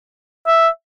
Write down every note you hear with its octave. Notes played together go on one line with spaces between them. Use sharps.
E5